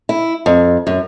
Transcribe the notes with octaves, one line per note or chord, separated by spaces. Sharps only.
E4
F2
F#2